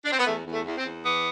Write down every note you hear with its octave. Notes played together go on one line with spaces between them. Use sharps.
D4
C4
B3
E2 A3
E2
A3
E2
C4
E2
E3 B3